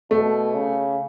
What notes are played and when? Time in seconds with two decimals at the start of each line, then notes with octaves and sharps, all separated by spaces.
0.11 B2 A3
0.54 C#3